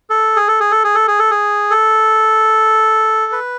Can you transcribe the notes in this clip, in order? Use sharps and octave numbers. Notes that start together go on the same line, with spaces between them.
A4
G#4
A4
G#4
A4
G#4
A4
G#4
A4
G#4
A4
B4